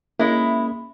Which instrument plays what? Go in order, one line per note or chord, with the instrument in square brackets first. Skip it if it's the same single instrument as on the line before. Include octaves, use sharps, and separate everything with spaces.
[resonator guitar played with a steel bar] G#3 E4 [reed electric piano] A#3 C#4